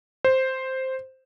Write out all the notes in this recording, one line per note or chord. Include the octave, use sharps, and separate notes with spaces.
C5